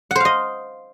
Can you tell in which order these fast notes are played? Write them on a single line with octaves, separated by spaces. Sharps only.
F#5 C5 F5 D#5